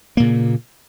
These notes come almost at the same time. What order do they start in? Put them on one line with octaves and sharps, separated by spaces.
A#3 A#2 C#3